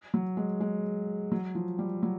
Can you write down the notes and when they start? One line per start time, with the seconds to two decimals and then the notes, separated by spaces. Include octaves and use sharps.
0.14 F#3
0.37 G#3
0.60 G#3
1.32 F#3
1.55 F3
1.79 G3
2.03 F#3